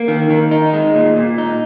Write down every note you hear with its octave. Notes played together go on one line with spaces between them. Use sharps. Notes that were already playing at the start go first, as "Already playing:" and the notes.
Already playing: A#3
D#3
D#3
D#4
G#3
A#2
A#2
D#4